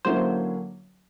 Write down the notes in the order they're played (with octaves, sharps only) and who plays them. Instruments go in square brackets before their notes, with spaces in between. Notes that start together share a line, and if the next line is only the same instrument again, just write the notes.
[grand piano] D3 F#3 A#3 C#4 E4 [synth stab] C5